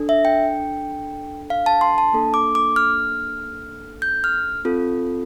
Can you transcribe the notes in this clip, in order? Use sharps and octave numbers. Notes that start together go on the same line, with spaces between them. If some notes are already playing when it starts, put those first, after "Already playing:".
Already playing: D4 A4
E5
G5
F5
A5
C6
A5
A#3 D4 A4
D6
D6
F6
G6
F6
C4 F4 A4